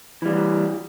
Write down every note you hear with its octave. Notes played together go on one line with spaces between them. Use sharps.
E3 G3